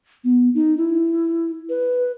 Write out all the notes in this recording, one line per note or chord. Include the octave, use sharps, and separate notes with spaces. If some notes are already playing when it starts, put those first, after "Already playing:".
B3
D#4
E4
B4